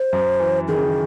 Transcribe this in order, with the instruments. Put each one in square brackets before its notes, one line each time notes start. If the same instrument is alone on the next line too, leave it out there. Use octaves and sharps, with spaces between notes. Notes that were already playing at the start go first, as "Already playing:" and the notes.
Already playing: [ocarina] C5
[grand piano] F#2
E3
[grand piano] D#3 [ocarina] G#4
[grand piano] C#3
D#3